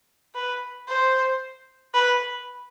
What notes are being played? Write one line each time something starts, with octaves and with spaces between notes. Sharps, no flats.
B4
C5
B4